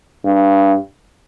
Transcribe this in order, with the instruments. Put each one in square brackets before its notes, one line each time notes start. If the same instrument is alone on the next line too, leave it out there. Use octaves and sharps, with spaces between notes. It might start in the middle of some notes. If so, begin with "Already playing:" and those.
[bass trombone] G2